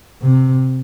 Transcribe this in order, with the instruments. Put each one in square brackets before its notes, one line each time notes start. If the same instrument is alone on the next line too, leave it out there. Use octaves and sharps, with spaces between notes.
[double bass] C3